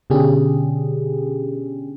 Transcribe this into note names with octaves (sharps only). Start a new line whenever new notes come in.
B2 D3 C#4 D4 G4 G#4